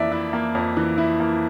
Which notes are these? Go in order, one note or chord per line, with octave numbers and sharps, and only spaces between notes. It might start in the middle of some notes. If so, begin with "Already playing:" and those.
Already playing: F2 E3 A#3 D5 E5
E4
A#3
F2
E3
E4
A#3